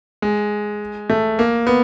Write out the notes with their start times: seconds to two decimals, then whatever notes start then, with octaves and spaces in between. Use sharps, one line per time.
0.22 G#3
1.10 A3
1.39 A#3
1.67 B3